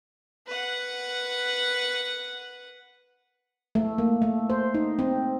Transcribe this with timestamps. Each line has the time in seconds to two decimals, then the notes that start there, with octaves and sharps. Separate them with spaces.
0.47 B4 F#5
3.75 A3
3.98 A#3
4.22 A3
4.50 C5
4.74 D#4
4.99 C4